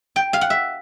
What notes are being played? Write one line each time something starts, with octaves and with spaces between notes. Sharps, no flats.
G5
F5
F#5
E5